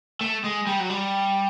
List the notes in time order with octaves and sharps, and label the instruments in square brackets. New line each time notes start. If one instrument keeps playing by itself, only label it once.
[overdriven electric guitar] A3
G#3
G3
F#3
G3